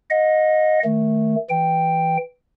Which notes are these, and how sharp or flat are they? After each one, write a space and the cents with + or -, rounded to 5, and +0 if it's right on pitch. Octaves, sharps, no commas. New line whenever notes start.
D#5 +0 F#5 -40
D#3 +5 A3 +0
E3 +0 G5 +0